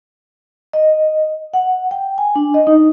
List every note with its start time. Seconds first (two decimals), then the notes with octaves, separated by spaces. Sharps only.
0.73 D#5
1.54 F#5
1.91 G5
2.18 G#5
2.35 D4
2.54 D#5
2.67 D#4